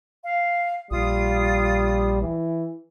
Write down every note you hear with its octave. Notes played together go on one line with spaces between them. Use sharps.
F5
A#1 G3 F4 D#6
E3